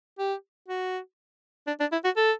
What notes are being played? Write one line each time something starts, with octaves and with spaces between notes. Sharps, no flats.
G4
F#4
D4
D4
E4
F#4
A4